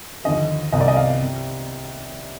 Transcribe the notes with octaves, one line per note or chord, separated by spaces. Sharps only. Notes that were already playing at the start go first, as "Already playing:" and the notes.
D#2 D3 F3 D#5
C2 C3 D#3 D#5
D5
D#5
F5
C3